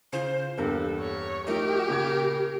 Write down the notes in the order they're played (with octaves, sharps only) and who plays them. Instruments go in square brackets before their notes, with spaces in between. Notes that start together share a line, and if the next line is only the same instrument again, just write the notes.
[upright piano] C#3 F4 [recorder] C5
[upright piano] E2 G2 A#3 [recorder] A4
[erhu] C#5
[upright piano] F3 A3 D#4 [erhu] G4 [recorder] A#4
[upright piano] A#2 C#3 G#6